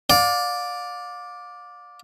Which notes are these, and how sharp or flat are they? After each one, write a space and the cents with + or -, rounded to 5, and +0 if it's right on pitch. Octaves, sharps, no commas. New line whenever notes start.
D5 +0 F5 +35